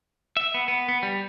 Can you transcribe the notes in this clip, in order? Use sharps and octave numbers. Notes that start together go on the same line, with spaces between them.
E5
B3
B3
B3
G3